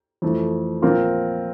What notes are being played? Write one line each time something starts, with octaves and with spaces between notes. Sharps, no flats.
F2 E3 A3
A#2 F3 C4 F4 A#4